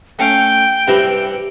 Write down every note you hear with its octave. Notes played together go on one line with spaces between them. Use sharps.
A3 C#4 F5 G5
G2 C3 E3